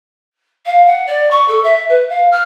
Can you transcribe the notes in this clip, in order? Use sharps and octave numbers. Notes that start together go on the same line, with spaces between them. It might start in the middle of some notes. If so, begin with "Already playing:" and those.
F5
F#5
D5
C#6
A4
E5
B4
F5
F6